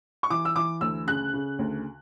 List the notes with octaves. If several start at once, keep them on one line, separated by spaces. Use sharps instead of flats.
C#6
E3 D6
E6
E3 D6
D2 E6
C#3 F#6
C#3
D2